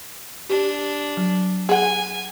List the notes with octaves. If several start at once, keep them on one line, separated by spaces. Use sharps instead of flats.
D4 G4
F#3
G#4 F#5 G#5